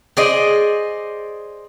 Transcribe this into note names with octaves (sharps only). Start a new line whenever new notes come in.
G#4 C5 D5 D#5